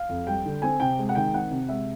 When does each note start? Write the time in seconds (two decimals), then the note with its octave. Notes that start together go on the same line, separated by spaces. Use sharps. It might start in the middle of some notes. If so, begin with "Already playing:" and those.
Already playing: F5
0.09 F2
0.27 G3 G5
0.45 D3
0.62 C4 G#5
0.80 C3 G5
0.99 G#3
1.09 F#5
1.15 D#3 G5
1.34 C4 F#5
1.51 C3
1.68 G#3 E5